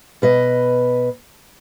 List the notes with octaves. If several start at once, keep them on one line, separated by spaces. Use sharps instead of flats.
B2 B4 D#5